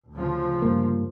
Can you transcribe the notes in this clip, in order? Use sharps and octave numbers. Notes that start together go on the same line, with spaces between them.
D2 C#3 F3
G2 A#3